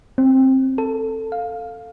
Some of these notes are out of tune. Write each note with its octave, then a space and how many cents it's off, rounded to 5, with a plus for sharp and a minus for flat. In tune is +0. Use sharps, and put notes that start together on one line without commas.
C4 +15
A4 +15
F5 +10